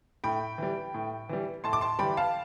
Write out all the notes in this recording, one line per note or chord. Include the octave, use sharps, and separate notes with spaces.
A2 G5 B5
E3 G3
A2
E3 G3
A2 A5 C6
D6
A5 C6
E3 G3 G5 B5
F5 A5